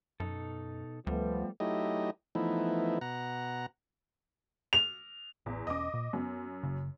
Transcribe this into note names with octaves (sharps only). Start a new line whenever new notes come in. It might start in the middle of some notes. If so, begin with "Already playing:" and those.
F#2 B2 D#4 A4
D2 F3 G3 A3 B3
F#3 A3 D#4 E4 G4 D#5
E3 F3 A3 B3 D#4 E4
B2 F#5 A#5
F7
A1 E2
E1 C#4 D#5 D6
A#2
F#2 B3
F#1 C#3